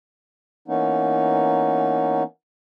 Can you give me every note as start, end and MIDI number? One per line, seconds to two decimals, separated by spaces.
0.68 2.23 52
0.68 2.23 58
0.68 2.23 59
0.68 2.23 61
0.68 2.23 63